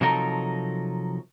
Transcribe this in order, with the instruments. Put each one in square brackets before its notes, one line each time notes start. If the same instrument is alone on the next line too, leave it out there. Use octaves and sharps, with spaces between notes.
[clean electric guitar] C3 F3 F#3 D#4 A4 A#4